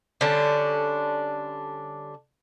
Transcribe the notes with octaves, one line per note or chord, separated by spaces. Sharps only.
D3 G3 C#4 D4